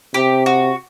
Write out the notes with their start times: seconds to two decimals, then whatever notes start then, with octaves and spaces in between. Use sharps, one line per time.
0.14 C3 G4
0.46 F#4